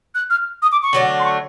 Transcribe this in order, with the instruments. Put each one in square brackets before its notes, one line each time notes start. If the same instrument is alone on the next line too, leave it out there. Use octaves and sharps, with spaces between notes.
[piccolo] F#6
F6
D#6
D6
C#6
[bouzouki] D3 F#3 A3 D4
[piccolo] C6
C#6